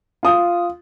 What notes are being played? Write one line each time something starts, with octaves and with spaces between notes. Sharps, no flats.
F4 D#6